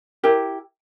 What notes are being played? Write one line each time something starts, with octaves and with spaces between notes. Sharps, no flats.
E4 G4 A#4